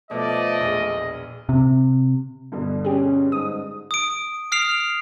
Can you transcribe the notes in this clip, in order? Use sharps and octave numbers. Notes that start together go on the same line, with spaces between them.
B2 F3 A3 D5 D#5
E1 A#1
C3
G2 B2 D3
C#4 G4 G#4
G#2 D#6
D#6 D7
D#6 F6 C7 D7 F7